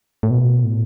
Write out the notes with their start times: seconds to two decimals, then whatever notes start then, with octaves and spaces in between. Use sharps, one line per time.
0.23 A2
0.30 B2
0.64 A2